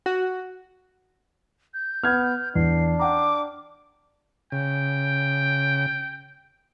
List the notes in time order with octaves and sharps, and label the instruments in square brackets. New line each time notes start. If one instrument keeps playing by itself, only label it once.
[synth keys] F#4
[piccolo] G6
[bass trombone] B3 [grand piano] F6 G#6
[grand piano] E2 [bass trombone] D4 [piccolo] C7
[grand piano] F#5 G5 A#5 [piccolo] D6
[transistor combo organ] C#3 [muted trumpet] G5